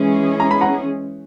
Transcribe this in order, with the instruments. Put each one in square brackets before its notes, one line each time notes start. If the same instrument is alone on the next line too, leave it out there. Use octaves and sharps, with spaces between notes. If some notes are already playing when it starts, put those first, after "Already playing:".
Already playing: [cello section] E3 G#3 C#4 G#4
[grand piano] A#5
B5
F#5 A#5